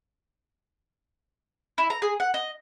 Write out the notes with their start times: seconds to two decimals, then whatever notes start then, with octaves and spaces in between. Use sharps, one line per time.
1.78 E4
1.90 A#5
2.02 G#4
2.20 F#5
2.34 D#5